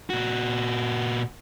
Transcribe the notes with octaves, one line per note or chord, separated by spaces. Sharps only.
A#2 F#4